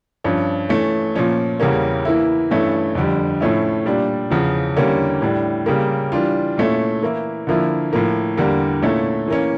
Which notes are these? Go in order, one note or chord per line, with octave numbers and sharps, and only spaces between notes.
G2 F3 C#4
E3 A3 C#4
A#2 F3 C#4
E2 C#3 G3 A#3 C#4
E3 A#3 E4
G2 E3 A3 C#4 E4
F2 D3 G3
A2 F3 A3 C#4 E4
A#2 G3 D4
E2 C#3 F3
E2 D3 G3 A#3 C#4
A2 G3 D4
C#3 G3 A#3
E3 G3 D4 F4
A#2 A3 C#4 E4
E3 A#3 E4
D3 F3 A#3 E4
A2 F3 A#3
E2 D3 G3 A#3
A#2 A3 C#4 E4
E3 A#3 C#4